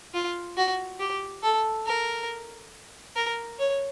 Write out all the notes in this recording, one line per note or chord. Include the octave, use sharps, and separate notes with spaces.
F4
F#4
G4
A4
A#4
A#4
C#5